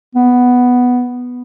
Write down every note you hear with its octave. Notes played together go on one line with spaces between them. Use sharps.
B3